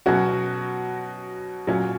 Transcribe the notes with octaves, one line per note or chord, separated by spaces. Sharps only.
B2 F#3 C#4 F#4
A#2 F#3 C#4